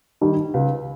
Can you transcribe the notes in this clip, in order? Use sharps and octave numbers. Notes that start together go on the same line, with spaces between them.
D#3 G3
C#2